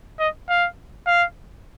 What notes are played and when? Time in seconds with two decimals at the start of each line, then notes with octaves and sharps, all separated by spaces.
0.19 D#5
0.49 F5
1.07 F5